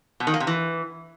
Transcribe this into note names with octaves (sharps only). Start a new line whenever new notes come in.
B2
D#3
A#3
C3
E3